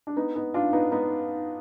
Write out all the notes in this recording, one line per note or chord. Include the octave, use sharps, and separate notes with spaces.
D4
B3 D#4
B3 D#4
D4 F4
B3 D#4
B3 D#4